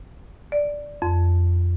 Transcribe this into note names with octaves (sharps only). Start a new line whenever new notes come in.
D5
F2